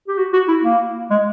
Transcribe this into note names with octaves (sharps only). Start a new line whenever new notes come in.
G4
F#4
F#4
E4
A#3
G#3